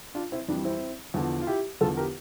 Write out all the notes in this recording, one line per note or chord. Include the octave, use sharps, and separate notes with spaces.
D4 F4
C4 E4
F2 E3 G3 D4
C4 E4
E2 D3 F3
F4
E4 G4
E2 D3 F3 F4 A4
G4 A#4